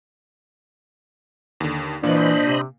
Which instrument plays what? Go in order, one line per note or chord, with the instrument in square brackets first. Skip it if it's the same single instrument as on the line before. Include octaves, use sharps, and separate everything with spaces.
[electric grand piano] D#2 D3
[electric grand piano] A#2 A#3 [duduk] E3 [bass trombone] D4 [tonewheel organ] C5 D#5 B5
[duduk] C3